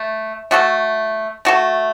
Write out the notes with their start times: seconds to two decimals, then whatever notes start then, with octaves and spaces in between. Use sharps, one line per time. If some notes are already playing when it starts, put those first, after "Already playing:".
Already playing: A3
0.51 A3 F#4 A4
1.45 A3 F#4 A4